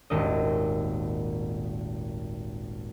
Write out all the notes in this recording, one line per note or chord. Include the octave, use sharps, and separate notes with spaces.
D#1 G#1 A#2 D#5